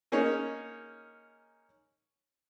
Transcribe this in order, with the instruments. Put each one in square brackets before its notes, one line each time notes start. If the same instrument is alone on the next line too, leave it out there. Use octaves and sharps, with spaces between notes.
[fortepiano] A#3 C#4 D#4 G#4 C#5